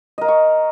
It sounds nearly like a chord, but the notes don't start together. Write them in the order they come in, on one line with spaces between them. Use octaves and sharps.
D#5 A#4 F5 C#6